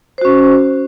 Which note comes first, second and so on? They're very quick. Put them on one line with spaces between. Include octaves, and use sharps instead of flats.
C5 F#4 C#4